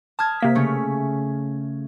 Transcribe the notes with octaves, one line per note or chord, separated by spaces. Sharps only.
A5 D#6 F6 G#6
C3 A#3 B6
C#3 A3 C#4